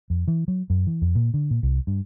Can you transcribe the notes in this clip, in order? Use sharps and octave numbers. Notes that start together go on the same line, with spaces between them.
F2
E3
F#3
F#2
E3
F2
A#2
D3
A#2
C2
G2